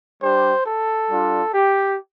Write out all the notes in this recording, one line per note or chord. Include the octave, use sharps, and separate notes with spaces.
G3 D4 G4 C5
A4
G3 D4 F4
G4